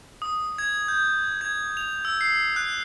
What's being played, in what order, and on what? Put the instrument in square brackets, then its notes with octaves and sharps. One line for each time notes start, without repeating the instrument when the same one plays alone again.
[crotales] D#6
G#6
G6
G#6
F7
E6
C7
F#6